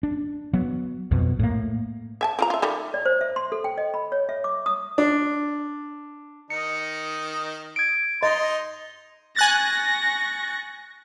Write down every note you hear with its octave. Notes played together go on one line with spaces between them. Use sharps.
D4
F#3 B3
B1 F2 B2
A2 A#3
E5 G#5 A5
C4 F4 A#5
F4 E5
D#3 G3 A3
D5
C5
E5
C6
A4
G5
D#5
B5
C#5
E5
D6
D#6
D4
D#3 D#4 C#7
G#6 D7
D#4 D#5 A#5 C6
G#5 C#6 F#6 A6 A#6